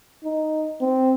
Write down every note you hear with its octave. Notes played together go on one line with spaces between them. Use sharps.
D#4
C4